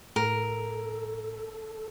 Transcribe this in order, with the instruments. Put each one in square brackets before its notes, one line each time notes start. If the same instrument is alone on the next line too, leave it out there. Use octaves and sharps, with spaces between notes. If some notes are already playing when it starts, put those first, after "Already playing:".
[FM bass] A2 [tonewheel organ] A4 [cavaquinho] A#4